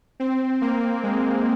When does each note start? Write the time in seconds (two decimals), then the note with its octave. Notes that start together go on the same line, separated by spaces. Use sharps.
0.20 C4
0.61 A#3
1.03 G#3